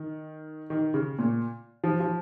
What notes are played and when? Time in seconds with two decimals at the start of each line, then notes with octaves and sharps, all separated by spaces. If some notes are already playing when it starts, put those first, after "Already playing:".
Already playing: D#3
0.70 D#3
0.94 C#3
1.19 A#2
1.84 F3
2.00 F3